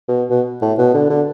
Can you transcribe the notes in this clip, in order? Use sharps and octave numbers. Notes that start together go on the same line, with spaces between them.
B2
B2
A2
B2
D3
D3